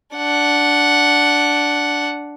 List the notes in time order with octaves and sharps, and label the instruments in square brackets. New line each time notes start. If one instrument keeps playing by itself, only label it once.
[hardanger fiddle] D4 F#5